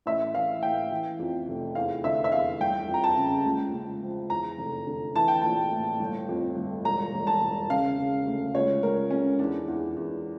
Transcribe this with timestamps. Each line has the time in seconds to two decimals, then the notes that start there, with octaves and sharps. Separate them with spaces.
0.06 A1 E5
0.34 E3 F5
0.63 A2 G5
0.91 E3
1.19 F2
1.48 F1
1.75 E2 F5
2.04 D3 E5
2.24 E5
2.32 E2 F5
2.60 G1 G5
2.88 F2
2.94 A#5
3.04 A5
3.17 C#3
3.46 C#2
3.73 C#2
4.03 F3
4.30 E2 A#5
4.58 F1
4.87 D3
5.15 E3 A5
5.28 G5
5.41 A#1 A5
5.72 A2
6.00 G1
6.29 F2
6.56 G1
6.85 E1 A#5
7.14 E1
7.27 A5
7.42 E1
7.70 C#3 F5
7.98 C#3
8.26 D2
8.55 C#2 C#5
8.83 C#2 A#4
9.10 C#2 C#4
9.39 E2 D4
9.68 E2
9.96 E2